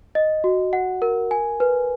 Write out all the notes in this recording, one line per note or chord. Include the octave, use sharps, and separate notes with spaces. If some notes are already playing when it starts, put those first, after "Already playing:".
D#5
F#4
F#5
A#4
G#5
B4